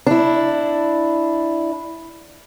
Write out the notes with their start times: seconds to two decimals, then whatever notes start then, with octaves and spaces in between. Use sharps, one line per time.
0.06 D4 E4